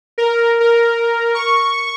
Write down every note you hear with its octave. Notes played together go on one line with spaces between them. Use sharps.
A#4
A#4
C#6